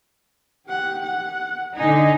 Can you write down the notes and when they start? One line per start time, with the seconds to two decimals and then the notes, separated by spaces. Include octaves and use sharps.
0.67 G4 F#5
1.02 F#5
1.77 D3 D#4 G#5